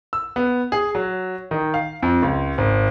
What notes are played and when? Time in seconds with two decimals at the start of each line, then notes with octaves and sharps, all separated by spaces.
0.13 E6
0.36 B3
0.72 G#4
0.95 F#3
1.51 D#3
1.74 F5
2.02 F2
2.23 C#2
2.58 G#1